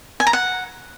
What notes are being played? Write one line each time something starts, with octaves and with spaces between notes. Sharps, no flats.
G#5
A#5
F#5